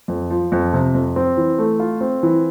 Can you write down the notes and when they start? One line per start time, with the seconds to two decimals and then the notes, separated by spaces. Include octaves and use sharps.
0.08 F2
0.30 F3
0.52 F2
0.73 C3
0.94 F2
1.16 C4
1.37 E3
1.58 A3
1.80 F4
2.01 C4
2.23 E3